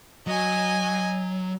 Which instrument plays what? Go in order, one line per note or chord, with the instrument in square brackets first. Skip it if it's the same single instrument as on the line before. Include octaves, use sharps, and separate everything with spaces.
[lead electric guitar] F#3 [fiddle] D#5 G#5